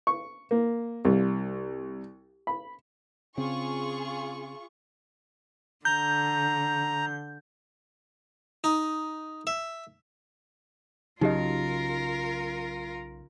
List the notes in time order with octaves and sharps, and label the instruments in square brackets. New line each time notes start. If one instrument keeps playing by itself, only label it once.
[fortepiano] C#6
A#3
C2
B5
[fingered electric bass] C#3 C4 [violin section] F4 G#4 C#6
[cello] D3 [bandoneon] A#5 [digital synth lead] G6
[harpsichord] D#4
E5
[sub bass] B1 [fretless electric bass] C#3 F#3 [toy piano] D#4 G4 D#5 [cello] F4 A#4